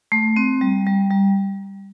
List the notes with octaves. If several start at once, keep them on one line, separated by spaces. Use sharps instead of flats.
A3
C4
G3
G3
G3